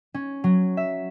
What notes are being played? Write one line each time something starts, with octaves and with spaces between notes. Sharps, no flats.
C#4
F#3
E5